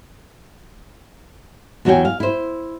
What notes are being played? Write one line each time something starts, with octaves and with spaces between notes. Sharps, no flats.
E2 F#3 F#4 C#5 G5 G#5
F5
E4 C5